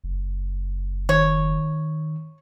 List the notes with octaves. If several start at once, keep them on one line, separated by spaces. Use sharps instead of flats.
F#1
D#3 C#5